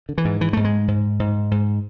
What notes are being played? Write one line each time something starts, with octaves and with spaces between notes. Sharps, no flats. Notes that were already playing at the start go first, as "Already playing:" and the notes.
D3
E3
G#2
E3
G#2 A3
G#3
G#2
G#2
G#2